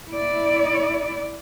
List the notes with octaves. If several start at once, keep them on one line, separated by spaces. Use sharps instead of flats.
E4 D5